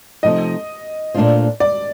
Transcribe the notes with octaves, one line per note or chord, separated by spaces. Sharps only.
C3 F3 A3 D#4 D#5
A#2 A3 D4 F4 C5
D5